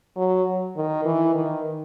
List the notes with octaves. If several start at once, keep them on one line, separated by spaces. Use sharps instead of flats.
F#3
D#3
E3
D#3